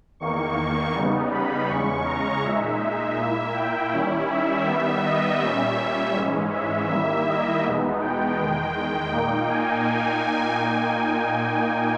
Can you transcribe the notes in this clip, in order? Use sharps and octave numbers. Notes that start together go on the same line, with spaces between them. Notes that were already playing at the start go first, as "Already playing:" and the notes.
E2 D#3 A#3 C#6
C#3 G3 B3 D#4
B5
E2 C#3 G#3 C#4 C#6
A#5
A#2 G#3 D#4 E5
A#2 A#3 E4
G5
D#3 G3 C#4 E4
E5
D#3 G3 B3
D#5
A#2 G3 C#4 E5
G#2 E3 G#3 C#4
E5
D#3 G3 A#3 E4 E5
D#5
E2 B2 G#3 B3 D#4
G5
E2 D#3 G#3
A#2 A#3 D#4
G#5